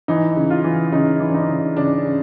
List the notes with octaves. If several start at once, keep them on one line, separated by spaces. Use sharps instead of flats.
E3 D#4
C#3
F4
E3
C#3 D#4
E3
D4
D#4
C#3
C#3 D4
C#3